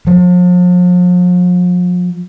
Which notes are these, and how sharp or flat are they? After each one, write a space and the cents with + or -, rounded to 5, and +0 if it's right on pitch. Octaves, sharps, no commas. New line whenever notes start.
F3 +40